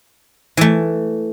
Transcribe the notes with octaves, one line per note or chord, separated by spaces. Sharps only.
E3 A3